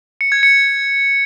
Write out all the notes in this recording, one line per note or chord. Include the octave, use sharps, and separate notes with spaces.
C#7
G#6
C#7